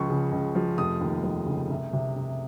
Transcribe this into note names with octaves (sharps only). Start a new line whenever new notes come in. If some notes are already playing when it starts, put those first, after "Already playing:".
Already playing: C#2 F3 C#6
C#3
C#2
F3
F1 D#6
D#2
F3
C#3
C2
C3
C2